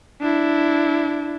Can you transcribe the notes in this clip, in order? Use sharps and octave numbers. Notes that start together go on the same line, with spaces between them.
D4 E4